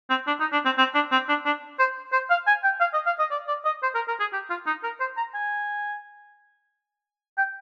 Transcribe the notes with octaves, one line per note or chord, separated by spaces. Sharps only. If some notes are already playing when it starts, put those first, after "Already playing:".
C4
D4
D#4
D4
C4
C4
D4
C4
D4
D4
C5
C5
F5
G#5
G5
F5
D#5
F5
D#5
D5
D5
D#5
C5
A#4
A#4
G#4
G4
F4
D#4
A#4
C5
A#5
G#5
G5